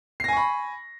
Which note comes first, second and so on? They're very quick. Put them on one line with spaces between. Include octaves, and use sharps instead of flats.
C7 A#6 G#5 C#6 B5